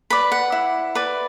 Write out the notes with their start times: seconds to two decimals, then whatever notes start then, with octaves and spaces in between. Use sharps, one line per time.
0.10 B4 D5 B5
0.32 F#5
0.52 E4
0.95 B4 D5